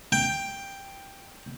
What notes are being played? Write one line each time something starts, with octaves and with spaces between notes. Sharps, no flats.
G5